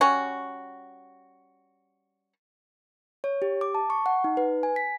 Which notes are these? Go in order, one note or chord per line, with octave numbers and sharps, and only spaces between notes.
G3 C#4 F#4
C#5
G4
D6
A5
C#6
F#5
D#4
B4
G#5
B6